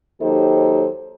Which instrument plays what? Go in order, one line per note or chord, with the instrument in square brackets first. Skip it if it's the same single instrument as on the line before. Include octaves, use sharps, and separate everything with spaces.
[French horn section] D#2 F#3 D#4 G4 A4 C5